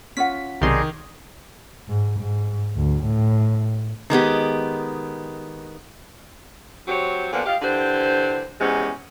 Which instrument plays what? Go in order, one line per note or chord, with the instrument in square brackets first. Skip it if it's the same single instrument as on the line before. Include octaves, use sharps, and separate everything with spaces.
[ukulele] C#4 F4 F#5 [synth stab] B6
[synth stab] B1 C3 C6 [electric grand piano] D#3 [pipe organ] D#4 G#4 D5
[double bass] G#2
G#2
D2
A2
[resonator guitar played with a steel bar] D#3 G#3 B3 G4
[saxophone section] F#3 C4 G4 C#5
A#2 D3 F3 B3
G4 D#5 F5
D3 E3 G4 C5
E2 C3 G#3 C#4